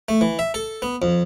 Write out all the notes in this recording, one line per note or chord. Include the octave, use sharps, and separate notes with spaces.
A3
E3
E5
A4
B3
F2